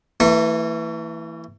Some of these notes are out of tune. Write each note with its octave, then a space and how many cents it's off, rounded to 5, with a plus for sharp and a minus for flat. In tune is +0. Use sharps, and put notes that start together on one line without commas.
E3 +0 A3 +45 C#6 -35